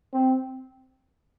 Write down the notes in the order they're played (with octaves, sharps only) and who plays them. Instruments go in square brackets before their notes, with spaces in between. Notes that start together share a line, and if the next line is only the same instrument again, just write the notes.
[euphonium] C4